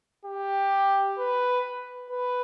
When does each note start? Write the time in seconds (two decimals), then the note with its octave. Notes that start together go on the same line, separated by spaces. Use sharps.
0.25 G4
1.19 B4
2.10 B4